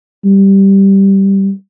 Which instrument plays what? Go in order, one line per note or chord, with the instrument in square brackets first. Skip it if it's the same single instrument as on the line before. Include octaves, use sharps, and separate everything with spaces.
[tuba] G3